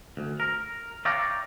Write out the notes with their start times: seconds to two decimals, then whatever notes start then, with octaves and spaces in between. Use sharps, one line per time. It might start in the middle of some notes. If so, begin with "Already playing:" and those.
0.17 D2
0.40 A#4
1.05 C#5 D5 E5 F5 G5 A#5